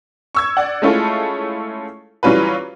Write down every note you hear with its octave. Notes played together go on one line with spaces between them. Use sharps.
C#6 E6 G#6
D5 F#5
G#3 A3 C#4 E4 F4 A4
E3 F#3 G3 C#4 F4 B4